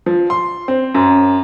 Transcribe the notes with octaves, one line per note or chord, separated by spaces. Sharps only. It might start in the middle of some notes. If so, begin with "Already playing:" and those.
F3
C6
C4
F#2